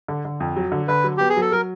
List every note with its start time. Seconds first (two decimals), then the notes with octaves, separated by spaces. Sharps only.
0.08 D3
0.25 D3
0.40 F2
0.56 F#3
0.72 D3
0.88 D3 B4
1.04 F#3
1.17 B3 G4
1.29 G#4
1.36 F#3 A4
1.52 F#3 A#4